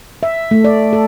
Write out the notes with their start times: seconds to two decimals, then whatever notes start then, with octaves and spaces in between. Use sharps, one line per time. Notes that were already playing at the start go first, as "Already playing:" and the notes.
0.23 E5
0.51 A3
0.64 D5
0.93 A4